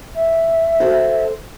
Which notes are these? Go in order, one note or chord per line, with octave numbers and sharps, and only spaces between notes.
E5
F#4 A4 C5